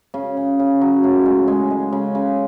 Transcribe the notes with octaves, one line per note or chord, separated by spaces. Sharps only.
C#3 C#4
C#3
C#3
F#3
A2
G#3
G#3
G#3
C#3
C#3